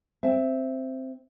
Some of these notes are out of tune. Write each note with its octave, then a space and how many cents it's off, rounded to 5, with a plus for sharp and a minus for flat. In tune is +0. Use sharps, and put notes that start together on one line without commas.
C4 +0 E5 +15